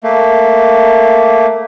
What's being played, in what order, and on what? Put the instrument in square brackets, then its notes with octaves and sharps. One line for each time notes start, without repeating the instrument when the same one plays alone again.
[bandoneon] A3 A#3